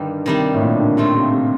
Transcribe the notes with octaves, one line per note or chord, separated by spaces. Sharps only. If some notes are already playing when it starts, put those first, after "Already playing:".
Already playing: G2 D3 D#3 G3
C3 D#3 G3 D4
A2
A#2
D3
C3 D#3 A3 C4 F4
C3
C3